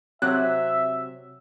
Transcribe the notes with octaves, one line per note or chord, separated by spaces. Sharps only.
C3 F#3 E5 F#6